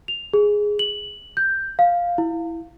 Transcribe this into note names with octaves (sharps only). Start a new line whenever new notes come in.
F7
G#4
F#7
G6
F5
E4